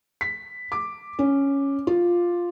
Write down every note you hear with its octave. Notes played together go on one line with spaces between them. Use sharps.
B6
D6
C#4
F4